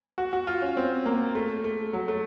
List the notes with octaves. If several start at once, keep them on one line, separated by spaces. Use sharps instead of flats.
F#4
F#4
F4
C#4
C4
A#3
A3
A3
F#3
A3